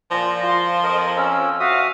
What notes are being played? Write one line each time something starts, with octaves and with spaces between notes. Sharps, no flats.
A#2 F3 A#6
F4 C6
F2 A#4 D#5
C#4 E6 F6
F#4 E5 F5 D#6